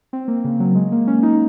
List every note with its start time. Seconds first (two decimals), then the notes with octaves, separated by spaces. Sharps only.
0.13 C4
0.28 A#3
0.44 C#3
0.60 F#3
0.75 G#3
0.92 A#3
1.07 C#4
1.23 D#4